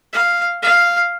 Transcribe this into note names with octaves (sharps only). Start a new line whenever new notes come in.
F5
F5